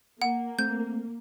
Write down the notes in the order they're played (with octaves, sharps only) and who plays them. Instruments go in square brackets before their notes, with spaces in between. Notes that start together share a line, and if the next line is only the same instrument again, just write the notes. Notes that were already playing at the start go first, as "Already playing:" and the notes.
[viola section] A#3 [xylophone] F#5
[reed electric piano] A3 C4 [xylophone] G6